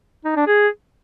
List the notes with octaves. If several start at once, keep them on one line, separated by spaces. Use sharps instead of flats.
D#4
D4
G#4